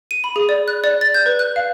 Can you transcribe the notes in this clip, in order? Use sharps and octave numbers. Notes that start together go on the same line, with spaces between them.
D#7
B5
G#4
D5
F#6
D5
A6
G6
B4
F#6
F5